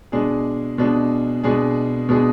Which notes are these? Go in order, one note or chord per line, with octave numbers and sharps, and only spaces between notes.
B2 G#3 D4 G#4
B2 G#3 D4 G#4
B2 G#3 D4 G#4
B2 G#3 D4 G#4